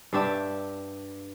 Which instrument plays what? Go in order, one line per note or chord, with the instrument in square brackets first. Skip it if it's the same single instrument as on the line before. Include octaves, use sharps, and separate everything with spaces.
[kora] G2 D4 G4 E5